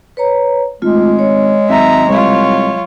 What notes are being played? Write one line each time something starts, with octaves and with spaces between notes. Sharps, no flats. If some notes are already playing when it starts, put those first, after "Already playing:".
B4 C#5 A#5
G#1 G#3 A3 F4
C#5
G#1 F#3 E5 A#5
C2 F4 C#5